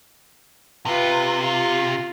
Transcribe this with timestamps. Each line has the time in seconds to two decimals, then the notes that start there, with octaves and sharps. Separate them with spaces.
0.86 C3 F4 B4
1.40 F4